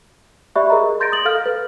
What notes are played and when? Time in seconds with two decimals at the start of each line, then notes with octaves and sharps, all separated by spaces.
0.55 G4 D5 E5 B5 C#6 F#6
0.70 G#4 A#4 D#5 A#5
1.00 C6 G6 A6 A#6 D7
1.12 D#6 A6 F#7
1.25 A4 F5 F6
1.46 B4